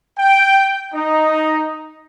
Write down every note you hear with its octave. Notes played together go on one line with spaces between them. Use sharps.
G5
D#4